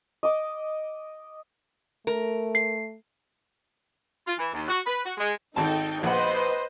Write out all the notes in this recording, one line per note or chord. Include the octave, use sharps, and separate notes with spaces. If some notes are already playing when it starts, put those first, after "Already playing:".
D#5 D6
A3 A#4
C7
F4
E3
D#2
F#4
B4
F#4
G#3
G#1 D#4 A4 G5 A5
A#1 B4 C5 D#5 F#5